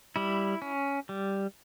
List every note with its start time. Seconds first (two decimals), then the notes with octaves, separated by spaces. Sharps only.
0.16 G3 E4
0.62 C#4
1.09 G3